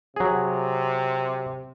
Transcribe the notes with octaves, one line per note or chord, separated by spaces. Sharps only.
C3 F#3 G#4